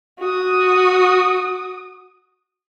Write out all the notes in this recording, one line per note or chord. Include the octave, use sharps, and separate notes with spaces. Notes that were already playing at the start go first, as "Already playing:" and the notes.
F#4 D#6